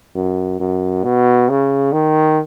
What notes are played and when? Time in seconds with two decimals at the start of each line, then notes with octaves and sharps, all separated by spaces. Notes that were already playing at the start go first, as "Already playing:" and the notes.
0.15 F#2
0.60 F#2
1.04 B2
1.49 C#3
1.93 D#3